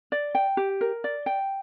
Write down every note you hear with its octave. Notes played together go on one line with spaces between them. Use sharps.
D5
G5
G4
A#4
D5
G5